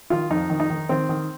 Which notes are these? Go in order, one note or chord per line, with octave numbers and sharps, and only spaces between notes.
D#3 F4
F2 D#4
D#3
D#4
D#3
D#3 C4
D#3